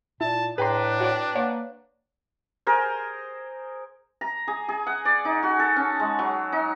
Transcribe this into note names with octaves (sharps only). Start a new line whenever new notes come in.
A#2 E4 A5
A2 D4 G#4 B4 G5 A#5 C6
F#4 C#5 D5
A#3 C#5 D5 F#5
G#4 A#4 C5
A#5
G#4
G#4
F#5
D5
D#4
F#4
A4
C#4
G#3
F#3
D#4